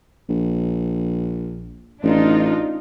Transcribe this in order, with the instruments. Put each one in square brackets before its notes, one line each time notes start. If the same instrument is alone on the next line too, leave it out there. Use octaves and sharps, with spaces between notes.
[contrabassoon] A#1
[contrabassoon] A1 [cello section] D4 D#4 F4